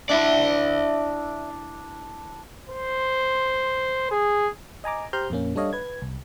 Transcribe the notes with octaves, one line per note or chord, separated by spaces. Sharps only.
D4 E4 D5 E5
C5
G#4
D#5 G#5 A#5 D6
G4 C5 A#5 C6 F6 G6
F2 A#2 A#3 C#4
G3 D4 A4 C#5 D#5 F5
B4 G#6
C2